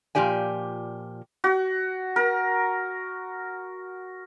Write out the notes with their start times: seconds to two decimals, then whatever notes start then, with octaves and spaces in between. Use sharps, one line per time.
0.15 A#2 F3 G4 D5 G#5
1.44 F#4
2.16 A#4